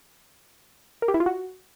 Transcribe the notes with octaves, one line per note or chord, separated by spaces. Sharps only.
A#4
G4
E4
F4
F#4